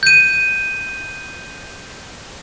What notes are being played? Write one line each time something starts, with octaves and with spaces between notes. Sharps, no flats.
G6 D#7